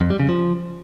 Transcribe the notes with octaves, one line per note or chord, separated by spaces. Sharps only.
F2
G3
C#3
F3